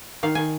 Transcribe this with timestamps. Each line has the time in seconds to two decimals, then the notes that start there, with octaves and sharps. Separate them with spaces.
0.23 D#3 F5
0.35 D#3 G#5